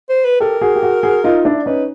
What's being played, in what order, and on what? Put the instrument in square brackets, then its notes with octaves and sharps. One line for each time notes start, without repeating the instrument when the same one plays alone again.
[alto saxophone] C5
B4
[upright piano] G4 A4 [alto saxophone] A#4
[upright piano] F#4 G#4
G4
F#4 G#4
F#4 G#4
D#4 F4
D4 E4
[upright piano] C#4 D#4 [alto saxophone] B4